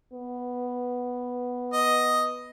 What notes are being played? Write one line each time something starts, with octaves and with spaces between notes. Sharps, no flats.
B3
D#5